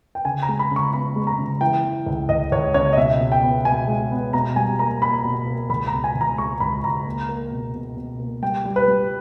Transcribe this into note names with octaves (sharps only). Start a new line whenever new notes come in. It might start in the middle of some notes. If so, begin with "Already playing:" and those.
G5
C#3 G#5
A#5
G#3
B5
C#3
C#6
B3 B5
G#3
A#5
C#3
E3 G5
E3
C#2
C#2 D#5
C#2 C#5
C#3 C#5
D#5
B2 E5
B2
G5
B3
B2 G#5
G#3
B3
B2 A#5
G3 G#5
A#3 A#5
A#3 B5
B2
A#3
C#2 B5
A#5
B2
G#5
C#2
A#5
G#3 C#6
C#2 B5
C#2 A#5
A#3
A#3
B2
B2
B2
A#3
G3 G5
G3
B4
G3